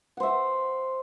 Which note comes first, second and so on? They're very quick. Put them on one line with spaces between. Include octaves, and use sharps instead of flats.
F#5 C5 E5